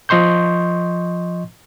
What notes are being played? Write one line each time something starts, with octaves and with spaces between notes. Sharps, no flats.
F3 D#5 C6 C#6 G6